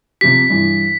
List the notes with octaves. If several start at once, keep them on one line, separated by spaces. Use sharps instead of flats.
C3 F3 G4 B6
G2 E3